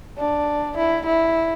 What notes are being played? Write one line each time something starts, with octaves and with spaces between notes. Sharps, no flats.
D4
E4
E4